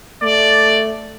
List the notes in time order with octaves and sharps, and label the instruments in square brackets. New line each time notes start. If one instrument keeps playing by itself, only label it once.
[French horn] A3 [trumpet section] D5